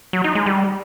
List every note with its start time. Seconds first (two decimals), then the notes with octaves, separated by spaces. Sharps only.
0.13 F#3
0.24 D#4
0.35 G#3
0.46 G3